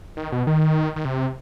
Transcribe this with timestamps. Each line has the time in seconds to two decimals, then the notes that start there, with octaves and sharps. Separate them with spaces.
0.17 D#3
0.32 B2
0.47 D#3
0.96 D#3
1.05 C3